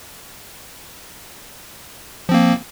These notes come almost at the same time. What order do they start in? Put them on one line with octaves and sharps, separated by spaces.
F3 C4 A#3